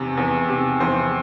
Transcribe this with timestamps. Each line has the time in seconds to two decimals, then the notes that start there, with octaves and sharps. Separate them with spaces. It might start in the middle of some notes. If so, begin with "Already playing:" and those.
Already playing: E2 C3
0.17 E2
0.49 C3
0.80 E2 C5